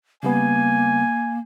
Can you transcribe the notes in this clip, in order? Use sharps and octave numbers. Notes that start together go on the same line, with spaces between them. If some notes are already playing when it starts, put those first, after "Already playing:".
C#3 G3 A#3 B3 G#5